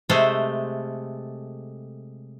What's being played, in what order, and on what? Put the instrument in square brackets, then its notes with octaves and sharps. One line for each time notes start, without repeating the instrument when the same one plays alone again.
[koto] C3 G#3 A3 A4 C5